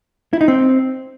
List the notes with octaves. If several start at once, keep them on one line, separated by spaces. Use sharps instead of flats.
E4
D#4
C4